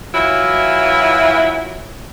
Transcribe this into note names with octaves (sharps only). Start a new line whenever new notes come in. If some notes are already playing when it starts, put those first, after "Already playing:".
E3 F#3 E4 F4 E5